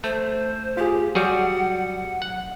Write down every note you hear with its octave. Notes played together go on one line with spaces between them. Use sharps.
A3 C5
F4 G4 G#4
F#3 G3 F#4 G#4 F#5
F#5